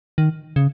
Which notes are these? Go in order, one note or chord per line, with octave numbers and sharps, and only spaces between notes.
D#3
C#3